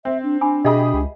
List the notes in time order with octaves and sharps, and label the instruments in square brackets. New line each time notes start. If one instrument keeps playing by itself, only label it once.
[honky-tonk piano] C4 [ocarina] E5
[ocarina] D4
[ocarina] D4 [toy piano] G#5 B5 D6
[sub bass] B2 [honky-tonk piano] G4 G#4 B5 [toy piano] D#5 E5
[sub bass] C#2